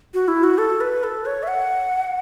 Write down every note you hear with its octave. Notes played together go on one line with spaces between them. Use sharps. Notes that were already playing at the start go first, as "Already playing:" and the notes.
F#4
E4
F#4
A4
B4
A4
C#5
E5
F#5